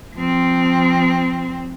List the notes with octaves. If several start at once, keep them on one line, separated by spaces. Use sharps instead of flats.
F3 C4